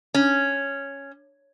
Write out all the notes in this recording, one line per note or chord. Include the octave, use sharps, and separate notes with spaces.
C#4